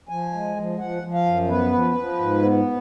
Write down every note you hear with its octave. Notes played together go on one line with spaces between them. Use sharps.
F3 G#5
G#3
F3
F3 F#5
F3
F5
F#2
B3 B4
F3
F3
G#2
B3